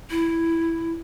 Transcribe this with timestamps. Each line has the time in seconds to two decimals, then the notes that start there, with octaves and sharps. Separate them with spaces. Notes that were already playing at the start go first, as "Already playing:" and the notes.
0.10 E4